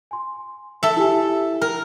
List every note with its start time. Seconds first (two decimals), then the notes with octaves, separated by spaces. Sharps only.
0.11 G#5 C6
0.83 A4 E5
0.97 E4 G4 G#5
1.61 A#4 G5